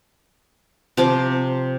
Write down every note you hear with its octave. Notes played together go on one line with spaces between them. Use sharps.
C3 F3 D6